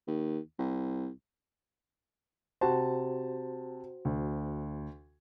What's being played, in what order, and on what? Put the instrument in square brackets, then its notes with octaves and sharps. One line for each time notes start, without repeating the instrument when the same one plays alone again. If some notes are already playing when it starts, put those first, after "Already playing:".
[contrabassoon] D#2
C2
[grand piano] C3 A5 [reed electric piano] F#4 C5
[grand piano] D2